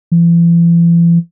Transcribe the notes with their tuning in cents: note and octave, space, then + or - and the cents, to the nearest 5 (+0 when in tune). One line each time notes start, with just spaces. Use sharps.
E3 +45